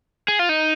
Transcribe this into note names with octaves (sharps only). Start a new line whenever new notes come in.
G#4
F4
D#4